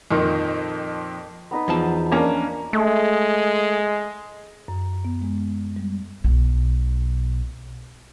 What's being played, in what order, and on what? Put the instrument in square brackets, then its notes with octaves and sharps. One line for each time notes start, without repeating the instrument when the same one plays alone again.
[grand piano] F2 A#2 D#3
[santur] B3 D#4 B4
[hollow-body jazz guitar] E2 F3 A5
[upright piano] A#3 C#4 [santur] D4 A#4 A#5
[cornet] G#3 [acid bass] A3
[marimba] F#2
B3
G#3
G3
[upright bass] B1 B2